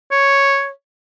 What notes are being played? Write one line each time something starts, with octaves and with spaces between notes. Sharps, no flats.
C#5